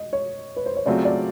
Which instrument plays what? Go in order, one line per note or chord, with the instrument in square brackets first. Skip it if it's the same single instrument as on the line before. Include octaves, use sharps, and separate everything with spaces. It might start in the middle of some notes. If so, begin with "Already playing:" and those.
Already playing: [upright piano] D#5
C#5
B4
C5
C#5
[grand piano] C#3 F#3 A3 C4 F4 [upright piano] D5
[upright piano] D5